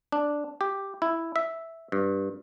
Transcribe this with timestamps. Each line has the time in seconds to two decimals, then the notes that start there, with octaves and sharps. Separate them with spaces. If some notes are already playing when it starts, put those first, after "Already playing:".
0.12 D4
0.61 G4
1.02 E4
1.36 E5
1.92 G2